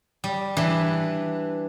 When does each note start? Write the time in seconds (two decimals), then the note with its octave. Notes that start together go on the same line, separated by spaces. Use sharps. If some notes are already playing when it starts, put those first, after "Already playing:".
0.24 G3
0.57 E3 D4 B4 C6